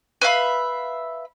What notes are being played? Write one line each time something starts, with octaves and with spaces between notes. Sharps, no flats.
B4 E5 F5 B5